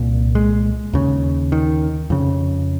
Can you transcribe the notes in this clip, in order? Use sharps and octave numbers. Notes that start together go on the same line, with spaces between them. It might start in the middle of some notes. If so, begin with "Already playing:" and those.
Already playing: C2 A#2
G#3
D#2 C#3
D#3
F2 C#3